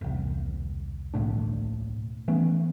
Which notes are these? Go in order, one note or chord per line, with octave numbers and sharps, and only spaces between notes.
E1 C2
D1 B1 A2 D4
E3 A3 B3 C#4